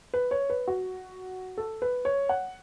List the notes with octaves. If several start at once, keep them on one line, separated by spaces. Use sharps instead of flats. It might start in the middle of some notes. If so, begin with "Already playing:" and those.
B4
C#5
B4
F#4
A4
B4
C#5
F#5